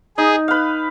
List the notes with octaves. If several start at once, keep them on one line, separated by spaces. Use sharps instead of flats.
D#4 G#4
B4 F5